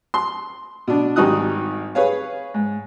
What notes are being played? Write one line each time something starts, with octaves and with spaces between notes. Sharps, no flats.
C6
B2 D4
G#1 G3 D#4 F#4 D#6 F#6
G#4 B4 C#5 F5
G#2